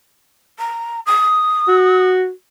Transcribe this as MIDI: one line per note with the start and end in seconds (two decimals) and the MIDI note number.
0.58 0.99 82
1.06 2.07 87
1.68 2.30 66